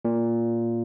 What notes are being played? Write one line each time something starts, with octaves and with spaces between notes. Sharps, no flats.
A#2